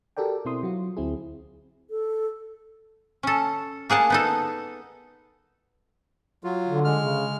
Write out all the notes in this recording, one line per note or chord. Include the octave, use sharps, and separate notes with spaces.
F#4 G4 A4 A#4 D5 G5
B2 C4 E4 C6 D#6
F#3 F4 F#4
D2 C4 E4 G#4
A4
C#4 A4
A#3 G#4 F#5 A5
B3 D#4 A4
F#3 F4
D3
G#3 F6
C#3